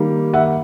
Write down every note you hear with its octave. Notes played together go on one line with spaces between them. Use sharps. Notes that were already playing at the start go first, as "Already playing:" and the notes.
Already playing: D#3 G3 A#3
E5 F#5